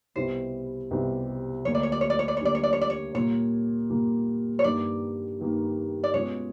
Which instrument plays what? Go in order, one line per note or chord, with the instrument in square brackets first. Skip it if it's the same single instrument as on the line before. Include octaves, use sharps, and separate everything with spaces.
[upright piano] C2 B2 G3 C4 E4 [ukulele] C5
[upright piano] C2 B2 G3 C4 E4
[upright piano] D2 D3 G3 A#3 [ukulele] C#5
[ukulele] D5
C#5
D5
C#5
D5
C#5
D5
C#5
[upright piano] D2 D3 G3 A#3 [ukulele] D5
[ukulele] C#5
D5
C#5
D5
C#5
[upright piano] A#2 G3 A#3 [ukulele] C#5
[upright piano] A#2 G3 A#3
[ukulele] C#5
[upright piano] G2 D#3 G3 A#3 [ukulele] D5
[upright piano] G2 D#3 G3 A#3
[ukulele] D5
[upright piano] B2 G#3 C#4 F4 [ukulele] C#5